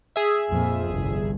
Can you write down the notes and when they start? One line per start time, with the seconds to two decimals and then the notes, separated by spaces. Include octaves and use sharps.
0.16 G#4 E5
0.52 A#1 F2 F3
0.88 G1 C2